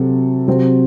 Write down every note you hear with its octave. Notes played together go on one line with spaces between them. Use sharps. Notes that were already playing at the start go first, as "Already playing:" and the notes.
Already playing: C3 F#3 C4 F#4 A4
C3 F#3 C4